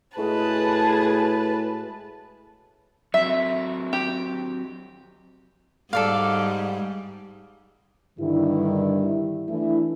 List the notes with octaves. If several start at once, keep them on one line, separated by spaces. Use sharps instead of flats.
A2 G#3 F#4 G#4 B4 A5
F#3 C4 E5
G4
G#2 G3 A4 D5 F5
G2 D3 D#3 G3 E4
E3 A3 D4 E4